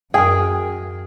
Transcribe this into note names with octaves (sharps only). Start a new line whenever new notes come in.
F#2 G#4 A#4 G5